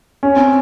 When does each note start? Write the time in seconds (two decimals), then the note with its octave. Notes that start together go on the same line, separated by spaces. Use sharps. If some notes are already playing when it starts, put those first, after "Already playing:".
0.23 C#4
0.36 C4